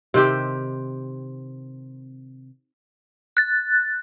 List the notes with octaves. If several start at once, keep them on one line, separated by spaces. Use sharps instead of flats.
C3 D#3 C4 G4
F#6 A6